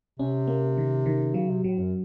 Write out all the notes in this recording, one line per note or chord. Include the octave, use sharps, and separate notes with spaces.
C3 C#4
A#3
D#3
D#3
C#3 F#3
C3
A2 F#3
F#2